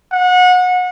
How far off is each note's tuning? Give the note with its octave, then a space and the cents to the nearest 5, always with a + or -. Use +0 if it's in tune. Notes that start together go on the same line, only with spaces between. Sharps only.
F#5 -30